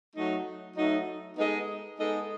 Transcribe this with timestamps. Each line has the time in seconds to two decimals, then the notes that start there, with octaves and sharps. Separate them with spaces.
0.14 F#3 A3 D#4
0.75 F#3 A3 D#4
1.36 G#3 B3 D#4 A4 D#5
1.98 G#3 B3 D#4 A4 D#5